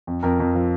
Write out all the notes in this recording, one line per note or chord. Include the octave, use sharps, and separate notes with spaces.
F2
F2 A#4
F2
F3